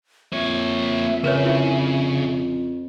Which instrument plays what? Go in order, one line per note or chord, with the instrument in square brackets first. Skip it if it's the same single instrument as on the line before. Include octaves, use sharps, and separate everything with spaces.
[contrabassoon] F2 [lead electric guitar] A#3 C#5 [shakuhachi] E5
[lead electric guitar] C#3 [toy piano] A#4 B4 C#5
[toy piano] E4